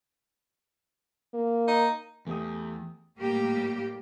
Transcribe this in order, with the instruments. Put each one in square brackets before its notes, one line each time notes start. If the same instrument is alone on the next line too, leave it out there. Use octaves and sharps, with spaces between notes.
[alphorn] A#3
[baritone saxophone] D#4
[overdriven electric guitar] E2 [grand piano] A3 G4 D#6
[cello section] A2 G3 A#3 G4